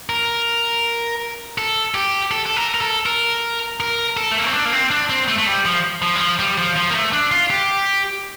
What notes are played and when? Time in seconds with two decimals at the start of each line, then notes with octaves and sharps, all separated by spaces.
0.09 A#4
1.58 A4
1.95 G4
2.31 A4
2.46 A4
2.56 A#4
2.74 A#4
2.81 A4
3.06 A#4
3.80 A#4
4.17 A4
4.31 A3
4.39 A#3
4.46 C4
4.54 D4
4.65 A#3
4.72 C4
4.91 D4
5.10 C4
5.28 A3
5.38 A3
5.47 G3
5.65 F3
6.02 F3
6.15 G3
6.21 F3
6.39 G3
6.58 F3
6.76 F3
6.90 A#3
6.95 A3
7.13 D4
7.32 F4
7.50 G4